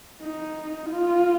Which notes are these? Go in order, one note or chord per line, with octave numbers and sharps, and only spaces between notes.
D#4
F4